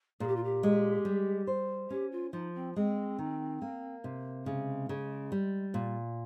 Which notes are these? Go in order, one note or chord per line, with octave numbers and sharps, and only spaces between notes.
A#2 G#4
G4
F4
G4
G#3
G3
C5
C#4 G4
F4
F3 D#4
C4
G#3 C4
D#3
A#3
C3
C#3 G#3
C#3
G3
A#2